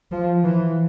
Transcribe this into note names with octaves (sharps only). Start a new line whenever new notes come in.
F3
E3